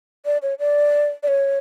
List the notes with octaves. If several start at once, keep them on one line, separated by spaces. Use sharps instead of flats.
D5
C#5
D5
D5
C#5